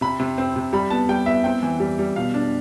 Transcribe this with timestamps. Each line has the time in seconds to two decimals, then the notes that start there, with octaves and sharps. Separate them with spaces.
0.01 C3 B5
0.20 C3
0.38 C4
0.56 C3
0.73 G3 B5
0.90 B3 A5
1.09 G3 G5
1.26 B3 E5
1.44 C4 G5
1.63 E3
1.80 G3
1.99 G3
2.16 B2 F5
2.34 D4